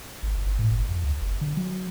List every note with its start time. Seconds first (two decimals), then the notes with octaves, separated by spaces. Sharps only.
0.23 G#1
0.37 G1
0.59 A2
0.71 G1
0.89 F2
1.04 C#2
1.21 F#1
1.41 D3
1.57 F#3